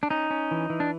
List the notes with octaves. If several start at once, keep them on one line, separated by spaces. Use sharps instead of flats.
D4
C#4 D#4
C#4
E3
E3
D4